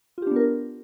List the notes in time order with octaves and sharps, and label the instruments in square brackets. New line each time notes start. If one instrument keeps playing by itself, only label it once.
[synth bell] F4
G4
D4
B3
A#4